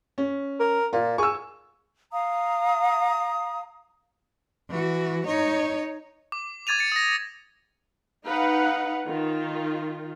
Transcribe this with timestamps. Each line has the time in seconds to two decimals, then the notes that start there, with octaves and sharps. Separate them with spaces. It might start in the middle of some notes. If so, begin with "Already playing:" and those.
0.18 C#4
0.60 A#4
0.93 A#2 F4
1.18 G#4 C#6 E6
2.12 F5 A#5 D#6
4.70 E3 F#4
5.28 D#4 C#5
6.32 D6
6.67 D6 G#6 A6 D#7 F7
6.79 A6 C#7
6.92 D#6 A#6
8.25 D#4 B4 F5 F#5
9.08 D#3 F4